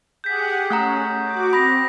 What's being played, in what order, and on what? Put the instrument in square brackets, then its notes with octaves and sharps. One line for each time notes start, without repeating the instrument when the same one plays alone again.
[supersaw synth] G4 G#4 F#5 [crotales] G6 B6
[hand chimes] A3 F#5 A#5 [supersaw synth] C#4 [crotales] D#6
[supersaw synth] F#4 D6
[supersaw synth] C4 [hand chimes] B5 [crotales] D#6 A#6